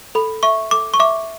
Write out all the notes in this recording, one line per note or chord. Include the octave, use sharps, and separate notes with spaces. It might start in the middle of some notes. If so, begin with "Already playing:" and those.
A4 B5
E5 C#6
A4 D6
C#6
E5 D6